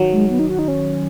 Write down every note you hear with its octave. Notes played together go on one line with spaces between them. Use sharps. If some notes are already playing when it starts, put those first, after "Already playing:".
Already playing: D#3 F#3
G#3
B3
D#4
F#4
D#4
C#4